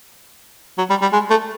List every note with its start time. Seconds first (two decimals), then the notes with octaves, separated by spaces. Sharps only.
0.78 F#3
0.90 G3
1.02 G3
1.13 G#3
1.30 A3